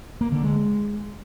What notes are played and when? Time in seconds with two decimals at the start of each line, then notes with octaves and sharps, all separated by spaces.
0.21 A#3
0.32 D3
0.43 G#3